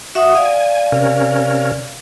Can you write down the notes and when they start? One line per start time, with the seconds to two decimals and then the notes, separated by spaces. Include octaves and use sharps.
0.15 F#4 E5 F#5 D#6
0.35 D5 F5 G#5
0.92 C3 C#4 A#4